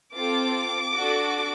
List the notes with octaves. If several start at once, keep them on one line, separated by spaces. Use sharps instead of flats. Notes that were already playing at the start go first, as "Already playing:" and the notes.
C4 F4 A4 D6
D4 F#4 A4